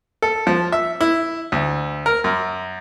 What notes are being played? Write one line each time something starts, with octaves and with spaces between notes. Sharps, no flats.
A4
F3
E5
E4
D2
A#4
F#2